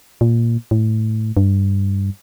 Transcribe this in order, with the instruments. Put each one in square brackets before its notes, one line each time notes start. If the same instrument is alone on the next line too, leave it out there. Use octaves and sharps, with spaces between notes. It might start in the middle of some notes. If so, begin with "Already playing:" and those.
[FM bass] A#2
A2
G2